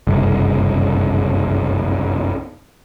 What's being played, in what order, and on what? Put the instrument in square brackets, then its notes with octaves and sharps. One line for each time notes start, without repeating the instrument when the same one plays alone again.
[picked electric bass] F#1 C2 G2